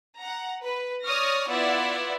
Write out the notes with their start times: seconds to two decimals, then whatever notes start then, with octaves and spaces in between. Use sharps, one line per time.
0.18 F#5 A#5
0.63 B4
1.03 C#5 D5 C#6 D#6 F6 A#6
1.49 B3 E4 F4 D5 E5 F#5